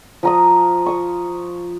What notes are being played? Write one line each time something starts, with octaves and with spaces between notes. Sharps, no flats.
F3 A#5 D#6
C#6 D#6